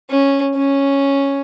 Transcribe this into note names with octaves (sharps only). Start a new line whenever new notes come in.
C#4
C#4